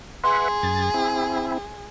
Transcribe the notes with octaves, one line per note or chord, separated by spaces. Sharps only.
G#4 B4 E5 F#5 C6
F#2 A6
C4 E4